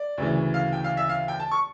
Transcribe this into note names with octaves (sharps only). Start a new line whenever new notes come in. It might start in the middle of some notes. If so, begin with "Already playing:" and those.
Already playing: D5
D2 C#3 E3
F5
G5
F5
E5
F5
G5
A5
C#6